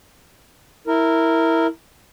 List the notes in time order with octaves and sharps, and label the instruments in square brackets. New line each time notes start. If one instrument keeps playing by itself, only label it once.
[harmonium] E4 A#4